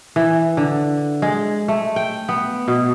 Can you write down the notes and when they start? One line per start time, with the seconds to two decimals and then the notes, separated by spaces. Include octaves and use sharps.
0.16 E3
0.57 D3
1.22 G#3
1.68 A3
1.96 G5
2.29 B3
2.68 B2